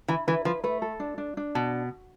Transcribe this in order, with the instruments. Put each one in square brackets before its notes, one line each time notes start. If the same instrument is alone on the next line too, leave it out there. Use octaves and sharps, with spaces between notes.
[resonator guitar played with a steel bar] E3 [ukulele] B5
[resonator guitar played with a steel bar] E3 [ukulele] B4
[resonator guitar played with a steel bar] F3 [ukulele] B4
[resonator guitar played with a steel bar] A3 [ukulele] B4
[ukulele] A4
D4
D4
D4
[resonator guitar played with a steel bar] B2 [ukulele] A5